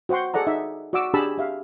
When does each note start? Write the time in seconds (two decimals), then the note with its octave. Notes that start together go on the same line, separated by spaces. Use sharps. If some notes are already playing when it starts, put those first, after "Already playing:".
0.09 F#4 C5 F#5 G5 C6
0.34 G#4 A4 D5 F#5 A#5
0.47 D#4 E5
0.93 F#4 D5 F#5 D6 E6
1.14 D4 G4 G#4 A5 B5 E6
1.38 G4 E5 F5